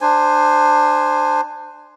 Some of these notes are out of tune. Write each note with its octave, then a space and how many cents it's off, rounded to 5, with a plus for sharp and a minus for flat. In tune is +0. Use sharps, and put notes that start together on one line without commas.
D4 +25 C5 +0 G#5 +0